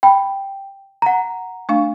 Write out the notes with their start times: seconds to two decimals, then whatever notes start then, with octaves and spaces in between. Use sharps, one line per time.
0.03 G5 B5
1.02 F#5 A#5
1.69 A3 D4 F5